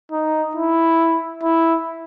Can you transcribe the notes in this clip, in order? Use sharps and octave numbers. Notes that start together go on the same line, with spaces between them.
D#4
E4
E4